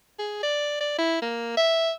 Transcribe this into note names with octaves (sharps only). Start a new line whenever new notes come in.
G#4
D5
D5
E4
A#3
E5